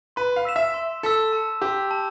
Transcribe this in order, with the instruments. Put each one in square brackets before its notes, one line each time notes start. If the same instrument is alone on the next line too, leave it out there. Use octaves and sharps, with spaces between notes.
[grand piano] B4 [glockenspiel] C6
[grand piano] F5
[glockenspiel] E6 B6 E7
[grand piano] E5
[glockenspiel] C6
[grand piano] A4 [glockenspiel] E6 B6 E7
[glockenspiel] A5
[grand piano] G4 [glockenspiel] C6 E6
[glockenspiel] A5